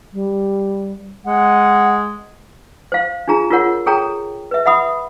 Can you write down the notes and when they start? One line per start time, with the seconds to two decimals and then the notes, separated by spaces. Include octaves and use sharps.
0.13 G3
1.26 G#3 F#5
2.92 C5 F5
3.28 D4 F4 G#4 A#5
3.51 F4 F#4 A#4 C#5 F#5
3.86 G#4 A4 C#5 G5 A#5
4.51 B4 E5
4.66 E5 F#5 B5 D#6